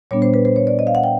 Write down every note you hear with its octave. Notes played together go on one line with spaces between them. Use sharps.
A#2 G3 B3 D4 C#5
C5
B4
C5
C#5
D5
D#5
F5
F#5
G5